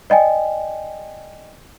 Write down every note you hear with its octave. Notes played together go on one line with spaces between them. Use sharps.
D5 D#5 G5 G#5